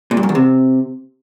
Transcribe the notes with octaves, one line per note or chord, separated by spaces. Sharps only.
A#2
G2
F#2
E2
C3